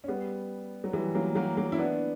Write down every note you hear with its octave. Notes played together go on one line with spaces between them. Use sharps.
C#4
G3 B3
F#3
E3 G3
F#3 A#3
F#3 A#3
F#3 A#3
E4
B3 D4